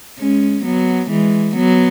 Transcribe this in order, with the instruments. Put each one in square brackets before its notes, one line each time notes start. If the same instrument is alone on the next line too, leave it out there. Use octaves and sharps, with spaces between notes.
[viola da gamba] G#3 C#4
F#3 B3
E3 G#3
F#3 B3